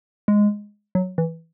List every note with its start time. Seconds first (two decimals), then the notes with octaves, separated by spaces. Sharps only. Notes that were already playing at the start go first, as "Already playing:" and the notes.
0.28 G#3
0.95 F#3
1.18 E3